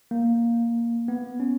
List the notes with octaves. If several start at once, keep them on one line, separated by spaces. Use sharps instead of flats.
A#3
B3
C#4